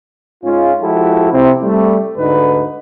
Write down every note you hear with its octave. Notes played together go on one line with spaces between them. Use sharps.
G#2 G#3 C#4 F4
F3 G#3 E4 F#4 G4 A4
C3 C4 E4
G3 A3
D2 G#2 D3 D#4 B4